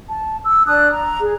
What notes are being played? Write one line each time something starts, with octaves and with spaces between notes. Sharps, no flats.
A5
E6
D4 A5 D#6 F#6
A#5
G#4